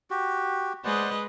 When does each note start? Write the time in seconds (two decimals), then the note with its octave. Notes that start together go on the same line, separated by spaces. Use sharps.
0.10 F#4 G4
0.84 G#3 B4 C5 D5 D#5 F#5